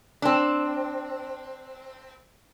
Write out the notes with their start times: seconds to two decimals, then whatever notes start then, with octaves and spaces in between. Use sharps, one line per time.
0.22 C4 D4